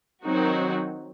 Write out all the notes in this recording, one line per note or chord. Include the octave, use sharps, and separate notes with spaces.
D#3 F#3 C4 D#4 F#4